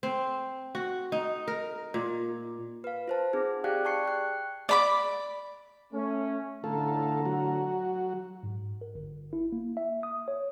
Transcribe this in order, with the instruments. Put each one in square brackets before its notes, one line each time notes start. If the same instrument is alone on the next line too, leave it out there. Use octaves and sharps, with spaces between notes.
[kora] C4
F#4
D#4
A#4
A#2
[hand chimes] B4 F5
F4 C5 A5
C4 D#4 G#4
G4 G#4 D5 F5 G5 F#6
D5 A5 C#6 C7 C#7
G5 F#6
[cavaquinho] D5 B5 D6
[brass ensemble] A3 C#4
[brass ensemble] A2 D3 A#5 [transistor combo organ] A3 F4 A4
[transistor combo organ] F#3 F#4
[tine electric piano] G#2
A#4
G1
E4
A#3
E5
D#6
C#5